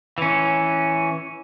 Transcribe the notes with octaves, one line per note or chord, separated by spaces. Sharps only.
E3 C#4